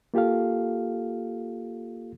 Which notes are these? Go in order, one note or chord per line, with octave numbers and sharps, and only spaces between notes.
A#3 F4 G4 A4 F5